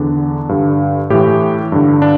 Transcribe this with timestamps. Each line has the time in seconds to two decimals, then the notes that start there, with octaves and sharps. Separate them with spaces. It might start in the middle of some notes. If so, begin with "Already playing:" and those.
Already playing: E2 D3 D4
0.49 G2 D3
1.10 A2 E3 G4
1.72 G2 D3
2.02 D4